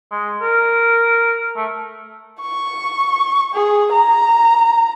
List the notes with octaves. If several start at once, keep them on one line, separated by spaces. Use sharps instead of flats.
G#3
A#4
A3
C#6
G#4
A#5